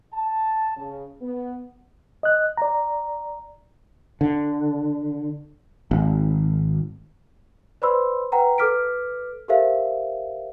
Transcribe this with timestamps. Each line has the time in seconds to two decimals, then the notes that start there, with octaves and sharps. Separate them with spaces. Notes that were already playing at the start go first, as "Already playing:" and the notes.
0.14 A5
0.77 C#3
1.21 B3
2.23 D#5 F#6
2.57 D5 A#5
4.21 D3
5.91 G#1
7.82 B4 C5 D5 B5 C6 E6
8.32 B4 F#5 G5 A#5
8.58 A4 B4 D6 F6 B6 D7
9.48 G4 A4 A#4 C5 E5 F5